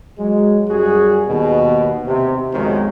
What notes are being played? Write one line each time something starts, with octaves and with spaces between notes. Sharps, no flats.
F#3 G#3
F#2 G3 F#4 G#4
D#2 B2
C3
B1 F2 D#3 F#3 G#3 C5